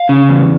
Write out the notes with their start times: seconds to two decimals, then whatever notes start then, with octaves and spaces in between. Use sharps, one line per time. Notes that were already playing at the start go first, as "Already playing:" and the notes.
Already playing: F5
0.09 C#3
0.29 E2